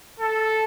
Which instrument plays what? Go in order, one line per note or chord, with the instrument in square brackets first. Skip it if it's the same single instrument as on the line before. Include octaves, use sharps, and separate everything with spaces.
[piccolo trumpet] A4